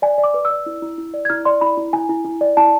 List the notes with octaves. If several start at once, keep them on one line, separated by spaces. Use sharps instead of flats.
D5 G#5
D5
D6
B4
E6
D5
E4
E4
E4
D5
G#6
E4 F6
D5 C6
E4 B5
E4
E4 G#5
E4
E4
D5
E4 A5